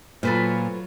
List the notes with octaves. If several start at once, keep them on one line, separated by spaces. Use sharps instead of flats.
A#2 F#3 F4 A4 B4 C5